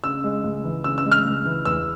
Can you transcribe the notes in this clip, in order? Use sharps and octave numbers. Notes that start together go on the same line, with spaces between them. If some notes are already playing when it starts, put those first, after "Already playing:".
C#3 E6
G#3
C#2
E3
C#3 E6
E6
G#3
F6
C#2
E3
E2 E6